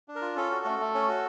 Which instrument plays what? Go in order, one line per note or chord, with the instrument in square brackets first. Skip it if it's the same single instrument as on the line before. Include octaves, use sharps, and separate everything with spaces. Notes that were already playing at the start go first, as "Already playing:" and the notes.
[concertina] D4
A#4
F4
C#4 A4
F#4
A3
A3
C#4
F#4